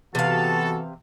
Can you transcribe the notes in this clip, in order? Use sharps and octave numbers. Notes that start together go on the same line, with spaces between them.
C3 E3 B3 F#4 A4 F5 A5